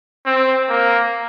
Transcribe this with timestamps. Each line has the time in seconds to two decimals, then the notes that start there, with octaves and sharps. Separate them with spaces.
0.26 C4
0.68 A#3